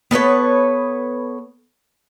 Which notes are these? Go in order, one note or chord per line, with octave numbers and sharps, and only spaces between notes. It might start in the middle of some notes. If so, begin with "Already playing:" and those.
B3 A4 B4 C#5